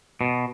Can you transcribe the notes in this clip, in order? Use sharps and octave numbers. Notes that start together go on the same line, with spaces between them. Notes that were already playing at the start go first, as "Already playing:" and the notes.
B2